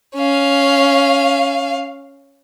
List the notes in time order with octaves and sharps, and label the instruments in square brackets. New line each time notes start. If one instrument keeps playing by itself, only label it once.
[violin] C#4 F5